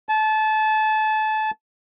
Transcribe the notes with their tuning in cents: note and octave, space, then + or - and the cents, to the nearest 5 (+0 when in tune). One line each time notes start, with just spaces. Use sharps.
A5 -25